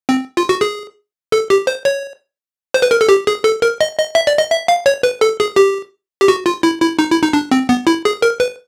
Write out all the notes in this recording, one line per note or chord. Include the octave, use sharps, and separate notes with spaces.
C4
F4
F#4
G#4
A4
G4
C5
C#5
C5
B4
A#4
A4
G4
G#4
A4
A#4
D#5
D#5
E5
D5
D#5
E5
F5
C#5
B4
A4
G#4
G4
G4
F#4
F4
E4
E4
D#4
E4
D#4
D4
C4
B3
E4
G#4
A#4
B4